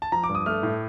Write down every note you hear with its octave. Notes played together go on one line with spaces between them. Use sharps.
A5
F3 A#5
D6
G2
D#6
A3 F6
A2